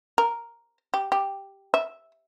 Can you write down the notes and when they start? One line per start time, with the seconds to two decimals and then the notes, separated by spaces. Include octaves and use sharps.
0.18 A#4
0.94 G4
1.12 G4
1.74 E5